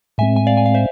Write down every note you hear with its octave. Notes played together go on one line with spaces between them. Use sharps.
A2 G#3 C4 E5 G#5
G#5
D5 F5
G#5
F5
C5 E5